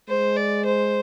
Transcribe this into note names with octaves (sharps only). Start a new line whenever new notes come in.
G#3 C5
D5
C5